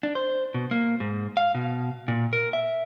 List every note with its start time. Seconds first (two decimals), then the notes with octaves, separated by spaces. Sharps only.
0.03 D4
0.15 C5
0.54 B2
0.71 A#3
1.00 G#2
1.37 F5
1.55 B2
2.08 A#2
2.33 A#4
2.53 E5